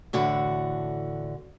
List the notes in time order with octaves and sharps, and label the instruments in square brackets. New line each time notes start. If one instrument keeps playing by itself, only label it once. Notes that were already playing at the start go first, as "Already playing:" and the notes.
[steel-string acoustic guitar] A2 D3 E3 F#4